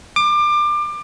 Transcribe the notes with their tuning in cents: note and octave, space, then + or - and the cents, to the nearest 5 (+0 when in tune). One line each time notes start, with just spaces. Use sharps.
D6 +25